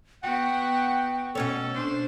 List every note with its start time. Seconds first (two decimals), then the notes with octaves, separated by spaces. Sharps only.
0.23 B3 F#4 F#5 G5
1.35 B2 C#4 A4 C#5
1.74 D4 C5